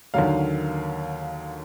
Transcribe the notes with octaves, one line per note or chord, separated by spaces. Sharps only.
D#2 D3 F#3 F5